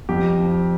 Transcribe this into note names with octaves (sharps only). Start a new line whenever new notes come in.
F2 G4
F3